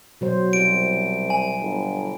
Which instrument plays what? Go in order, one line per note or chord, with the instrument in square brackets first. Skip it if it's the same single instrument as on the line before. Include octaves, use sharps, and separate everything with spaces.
[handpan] B2 F#3 C5
[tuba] C2 [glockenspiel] D7
[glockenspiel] G#5
[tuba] G1